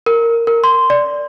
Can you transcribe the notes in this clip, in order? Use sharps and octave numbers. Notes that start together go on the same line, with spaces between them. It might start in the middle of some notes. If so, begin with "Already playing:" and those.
A#4
A#4
C6
D5